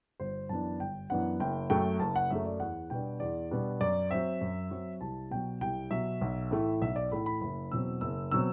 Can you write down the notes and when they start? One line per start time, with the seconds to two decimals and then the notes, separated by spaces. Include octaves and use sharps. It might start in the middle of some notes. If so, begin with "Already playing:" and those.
0.20 G1 C5
0.49 F#2 E3 B3 D4 A5
0.80 G1 G5
1.10 F#2 E3 B3 D4 F#5
1.40 F#1 G5
1.70 F#2 F#3 A3 G5
2.00 F#1 A5
2.16 F#5
2.30 F#2 F#3 A3 E5
2.46 D5
2.60 E2 F#5
2.90 B2 G3 B3 D4 G5
3.20 E2 D5
3.50 B2 G3 B3 D4
3.81 F#2 D5
4.11 F#3 C4 E5
4.41 F#2
4.71 F#3 C4
5.01 C2 A5
5.31 B2 F#3 G5
5.61 C2 G5
5.91 B2 F#3 E5
6.21 B1
6.51 A2 E3 A3
6.81 B1 E5
6.96 D5
7.11 A2 E3 A3 B5
7.26 B5
7.41 F#1 B5
7.71 E2 B2 F#3 C4 E6
8.01 F#1 E6
8.32 B2 F#3 C4 E6